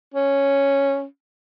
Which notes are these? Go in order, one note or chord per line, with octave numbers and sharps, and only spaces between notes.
C#4